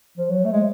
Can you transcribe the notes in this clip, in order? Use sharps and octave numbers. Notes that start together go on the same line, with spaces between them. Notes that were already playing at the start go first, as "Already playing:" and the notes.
F3
F#3
A3
G#3